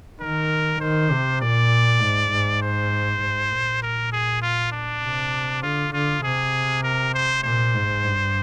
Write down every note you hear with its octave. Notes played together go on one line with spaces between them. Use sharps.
D#3 A#4
D#3 C5
C3
A#2 D5
G#2
G#2
C5
G#2
A#2
A#4
G#4
F4
D4
C3
D3 F4
D3 F4
C3 G#4
A#4
C5
A#2 C5
G#2
G2